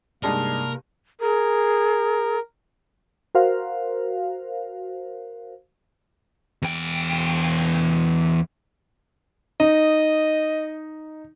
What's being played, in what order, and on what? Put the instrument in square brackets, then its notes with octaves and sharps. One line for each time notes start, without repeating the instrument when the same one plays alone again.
[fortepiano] G2 G#3 D#4 [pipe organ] C3 A#3 [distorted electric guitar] A#4 [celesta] D5 A5
[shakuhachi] G#4 [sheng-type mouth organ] A#4
[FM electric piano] F#4 A#4 C5 F5
[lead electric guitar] E2 G5
[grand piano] D#4 [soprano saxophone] D#5